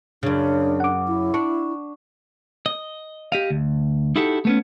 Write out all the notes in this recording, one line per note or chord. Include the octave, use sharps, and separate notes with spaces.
F#2 C#3 D4
F#5 D6
E4
D4 C#6
D#5
G4 D#5 F5
D2
D#4 E4 F#4 G4 A4
A3 B3 C#4